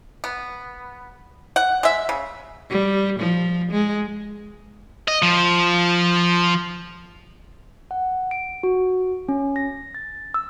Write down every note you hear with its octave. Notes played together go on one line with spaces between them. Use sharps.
B3
F#5
G#3 E5
C#3
G3
F3
G#3
D#5
F3
F#5
D7
F#4
C#4
A#6
A6
E6